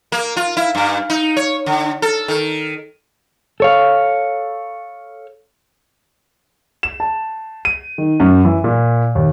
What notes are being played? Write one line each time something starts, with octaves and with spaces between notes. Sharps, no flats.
A#3
F4
E4
G2
D#4
C#5
D3
A4
D#3
A4 C#5 F5
E7
A5
D#7
D#3
F#2
E3
A#2
D#2